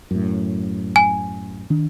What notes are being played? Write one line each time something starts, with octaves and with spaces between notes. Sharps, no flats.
F#2 A2
G#5
D#3 D4